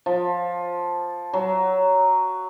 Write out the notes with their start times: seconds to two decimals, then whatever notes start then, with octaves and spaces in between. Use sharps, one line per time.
0.06 F3
1.33 F#3